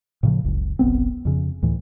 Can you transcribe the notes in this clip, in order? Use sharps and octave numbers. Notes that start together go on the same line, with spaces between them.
A2 C#3 F3
F#1 C#2
F1 B1 B3 C4
F2 C#3
D2 A2 E3